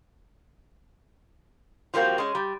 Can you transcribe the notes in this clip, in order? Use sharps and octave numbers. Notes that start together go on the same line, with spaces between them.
F3 G3 A#3 C4 F#4
G#3 C#4
G3